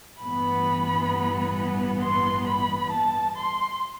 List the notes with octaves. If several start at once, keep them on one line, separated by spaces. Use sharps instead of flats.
A1 G2 E3 B3 B5
C6
B5
A5
C6